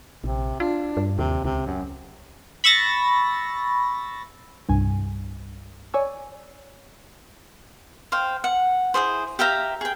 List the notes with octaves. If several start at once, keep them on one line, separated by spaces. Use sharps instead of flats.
A#1 C3
D4 F4
G2
D#2 C3
C#2 C3
F#2
B5 C#6 E6 A6 A#6
C2 G2 G#5
C#5 D5 G#5 C#6 E6
C5 F5 G5
F#5
E4 F4 G#4 C5
G4 E5 F5 A#5
G#4 G5